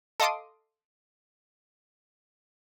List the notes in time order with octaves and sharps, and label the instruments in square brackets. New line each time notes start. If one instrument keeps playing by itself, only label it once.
[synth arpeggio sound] A4 D#5 F5 C6 D6 D#6